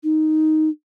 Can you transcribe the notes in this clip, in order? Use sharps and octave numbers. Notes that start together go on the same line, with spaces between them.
D#4